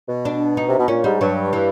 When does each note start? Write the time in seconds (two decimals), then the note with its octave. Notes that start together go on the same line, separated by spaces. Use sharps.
0.09 B2
0.25 D4
0.57 D#4
0.68 C3
0.78 B2
0.88 A#2 C#4
1.04 G#2 G3
1.20 G2 F#3
1.53 E3